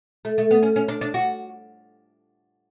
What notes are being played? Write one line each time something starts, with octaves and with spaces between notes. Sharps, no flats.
A3
A3
B3
C#4
C#4
D4
D4
F#4